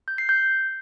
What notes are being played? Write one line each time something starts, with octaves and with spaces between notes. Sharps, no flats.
G6
C7
G6